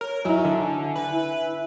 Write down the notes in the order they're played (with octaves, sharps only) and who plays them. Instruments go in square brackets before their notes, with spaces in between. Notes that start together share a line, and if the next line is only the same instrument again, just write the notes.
[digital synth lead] A#4 [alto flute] C#5
[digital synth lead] F#3 [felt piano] D#4 E4 D#5 [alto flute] G#5
[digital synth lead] D3 [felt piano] E5
[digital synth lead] B4 [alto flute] G#5
[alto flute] E4